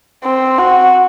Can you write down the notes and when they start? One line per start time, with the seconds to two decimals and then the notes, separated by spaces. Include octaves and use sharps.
0.24 C4
0.58 F#4